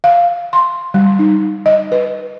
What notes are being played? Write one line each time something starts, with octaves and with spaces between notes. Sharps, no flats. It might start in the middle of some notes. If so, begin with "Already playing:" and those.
F5
C6
G3
D#4
D#5
B4